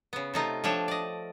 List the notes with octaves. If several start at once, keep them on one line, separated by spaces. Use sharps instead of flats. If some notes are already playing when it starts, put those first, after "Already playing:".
C#3 B3
C3 A3 D#4 F4
F3 A3 D4 C#5 G5
D5 D#5